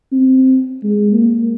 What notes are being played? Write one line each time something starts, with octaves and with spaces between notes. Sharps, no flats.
C4
G#3
A#3